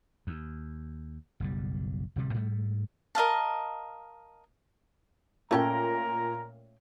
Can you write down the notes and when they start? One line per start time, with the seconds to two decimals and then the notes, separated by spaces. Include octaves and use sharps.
0.27 D#2
1.40 F#1 B1 G3
2.16 D1 C3 G3
2.34 G#2 G3 A3
3.15 A#4 D#5 F5 A5
5.51 A#2 A3 A#3 C#4 A#4 G5 A#5